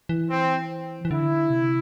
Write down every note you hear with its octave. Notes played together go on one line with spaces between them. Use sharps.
E3
C4
E3
D3 E4
C3